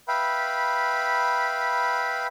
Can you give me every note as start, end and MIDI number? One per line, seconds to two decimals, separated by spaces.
0.08 2.27 71
0.08 2.27 76
0.08 2.27 77
0.08 2.27 79
0.08 2.27 83